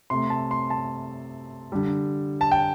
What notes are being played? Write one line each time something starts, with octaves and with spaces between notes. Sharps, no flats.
C3 A3 C6
A5
C6
A5
D3 G3
A5
G5